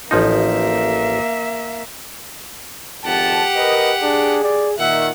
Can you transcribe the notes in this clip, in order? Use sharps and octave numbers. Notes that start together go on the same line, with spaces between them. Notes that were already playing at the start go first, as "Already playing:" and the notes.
A1 F3 A#3 D#4 E5
G#1 F2 G4 F#5 A5
A#4 B4 D#5
D4 G#4
D5
A#2 D#3 E5 F#5